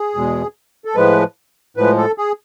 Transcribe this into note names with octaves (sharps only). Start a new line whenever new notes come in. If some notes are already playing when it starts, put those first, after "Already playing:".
Already playing: G#4
E2 B2 G#3
A4
A2 F3 G#3 B4
A2 F3 G#3 B4
A4
G#4